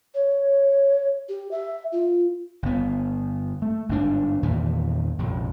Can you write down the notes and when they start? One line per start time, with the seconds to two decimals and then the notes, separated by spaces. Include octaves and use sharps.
0.15 C#5
1.29 G4
1.51 E5
1.92 F4
2.63 G1 B3
3.62 A3
3.89 G1 G#2 D4
4.43 E2 A#2 D#3 E3
5.19 A#1 F2 C3